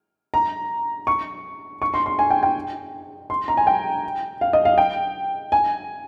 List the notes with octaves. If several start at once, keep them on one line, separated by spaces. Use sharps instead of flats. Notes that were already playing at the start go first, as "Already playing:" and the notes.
A#5
C#6
C#6
C6
C6
G#5
G5
G5
C6
A#5
G#5
G5
F5
D#5
F5
G5
G#5